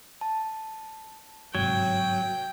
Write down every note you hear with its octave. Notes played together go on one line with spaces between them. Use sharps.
A5
G1 G#2 C3 F#3 G5 G#6